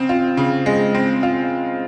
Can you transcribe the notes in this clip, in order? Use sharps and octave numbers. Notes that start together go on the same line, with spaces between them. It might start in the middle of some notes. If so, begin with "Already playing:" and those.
Already playing: C#3 C4
F4
C#3
G#3
C4
F4